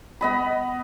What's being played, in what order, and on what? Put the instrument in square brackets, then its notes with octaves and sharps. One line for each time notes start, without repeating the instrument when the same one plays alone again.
[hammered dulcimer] B3 D#5 B5